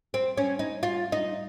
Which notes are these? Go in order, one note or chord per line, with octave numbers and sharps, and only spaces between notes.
C4
C#4
D#4
F4
D#4